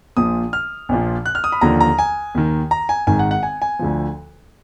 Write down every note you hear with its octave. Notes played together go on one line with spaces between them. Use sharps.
A#1 A#2 F3 D#6
F6
A#1 A#2 F3
F#6
F6
D#6
B5
D#2 D3 F3 A#5
A#5
G#5
D#2 D#3
A#5
G#5
G#1 G#2 D#3 G#5
F#5
F#5
G#5
G#5
D2 D3 F3